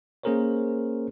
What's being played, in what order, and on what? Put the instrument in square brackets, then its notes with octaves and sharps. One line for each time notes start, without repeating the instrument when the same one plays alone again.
[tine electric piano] A#3 C#4 G#4 A#4 C5 C#5